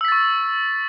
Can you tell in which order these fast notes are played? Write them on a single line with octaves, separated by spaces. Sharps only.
E6 B6 A6 C#6